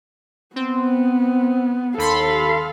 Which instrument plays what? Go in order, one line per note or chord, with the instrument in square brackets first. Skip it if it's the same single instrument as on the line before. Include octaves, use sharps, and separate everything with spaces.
[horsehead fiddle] B3 [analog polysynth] C4
[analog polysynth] D#2 B5 C6 [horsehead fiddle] A4 F5